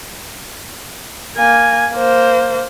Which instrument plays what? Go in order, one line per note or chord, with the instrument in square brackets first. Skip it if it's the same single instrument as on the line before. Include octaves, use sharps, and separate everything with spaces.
[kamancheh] A#3 G#5
A#3 C5